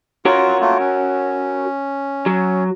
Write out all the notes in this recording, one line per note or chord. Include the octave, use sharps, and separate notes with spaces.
F4 F#4 A#4 C#5
A3 A#3 F4
C#4
F#3